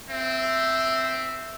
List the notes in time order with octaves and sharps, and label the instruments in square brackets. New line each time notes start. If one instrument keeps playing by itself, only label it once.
[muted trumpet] C4 [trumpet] E5